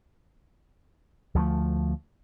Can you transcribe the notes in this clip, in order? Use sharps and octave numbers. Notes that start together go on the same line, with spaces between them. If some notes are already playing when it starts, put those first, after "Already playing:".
D2 F3 G#3 A3